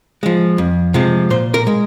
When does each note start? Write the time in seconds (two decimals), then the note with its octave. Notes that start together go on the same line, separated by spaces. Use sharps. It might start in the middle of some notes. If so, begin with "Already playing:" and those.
0.23 F3 G#3
0.58 F2
0.94 C3 F3 G#3
1.30 A#2 C5
1.54 A#4
1.67 G#3